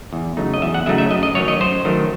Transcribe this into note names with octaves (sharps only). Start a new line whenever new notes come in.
E2
C#3 F#3 A3 D#4
D#5
E2 E5
F#5
C#3 F#3 A3 D#4 E5
E5
F#2 D#5
D#5
D#3 F#3 A3 C#5
D#5
F#2 C5
D#3 F#3 A3